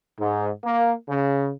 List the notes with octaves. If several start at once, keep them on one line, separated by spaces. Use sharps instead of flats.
G#2
A#3
C#3